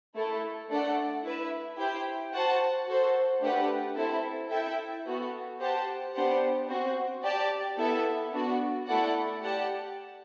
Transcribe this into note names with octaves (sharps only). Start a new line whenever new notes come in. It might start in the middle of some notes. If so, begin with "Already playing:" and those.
A3 E4 A4
A3 D4 A4 D5 F#5
E4 B4 E5
E4 G4 C5 G5
F#4 C5 F#5 A5
F#4 A4 C5
A3 D4 G4 B4 F#5
C4 E4 A4
E4 A4 E5 G5
B3 F#4 A4
G4 C5 F#5 A5
B3 D4 G4 C5 F#5
C4 F#4 C5
G4 D5 A5
B3 E4 A4 E5
B3 D4 F#4
A3 E4 A4 D5 F#5
G4 D5 F#5 A5